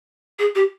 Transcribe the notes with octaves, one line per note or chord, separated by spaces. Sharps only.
G#4
G4